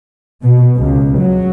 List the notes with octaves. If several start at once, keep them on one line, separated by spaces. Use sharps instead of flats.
B2
C#2
F#3